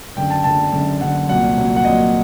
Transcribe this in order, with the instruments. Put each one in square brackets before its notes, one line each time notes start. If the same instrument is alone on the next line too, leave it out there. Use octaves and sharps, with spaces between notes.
[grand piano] F#1 F#2 D3 G5
A5
F#1 F#2 D3 A5
F#1 F#2 D3
F#1 F#2 D3 F#5
C2 A#2 F#3 F#5
C2 A#2 F#3
F#5
C2 A#2 F#3 D#5